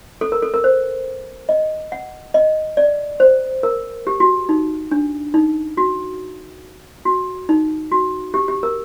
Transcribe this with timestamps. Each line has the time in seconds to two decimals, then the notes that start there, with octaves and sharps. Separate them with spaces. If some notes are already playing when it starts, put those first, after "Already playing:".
0.21 A4
0.32 A#4
0.42 A4
0.54 A#4
0.64 C5
1.49 D#5
1.92 F#5
2.34 D#5
2.77 D5
3.20 C5
3.63 A#4
4.07 G4
4.20 F#4
4.49 D#4
4.91 D4
5.34 D#4
5.77 F#4
7.05 F#4
7.49 D#4
7.92 F#4
8.34 G4
8.48 G4
8.63 A#4